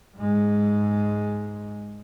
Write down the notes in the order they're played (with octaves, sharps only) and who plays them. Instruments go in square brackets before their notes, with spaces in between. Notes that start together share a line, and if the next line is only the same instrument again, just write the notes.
[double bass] G#2 G#3